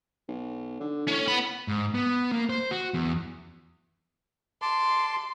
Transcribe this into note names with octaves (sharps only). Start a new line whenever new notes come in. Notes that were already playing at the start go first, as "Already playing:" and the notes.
B1
D3
A2 C#4
B3 B5
G#2
B3
A#3
C5
F#4
E2
A5 C6 D6